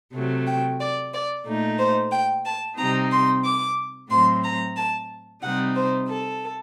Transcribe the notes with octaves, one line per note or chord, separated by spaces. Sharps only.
C3 F#3 A3
G5
D5
D5
A#2 A3 D#4
C5
G5
A5
C3 G3 C4 D#4 A#5
C6
D6
A2 F#3 C4 C6
A#5
A5
C3 G3 C4 D#4 F#5
C5
A4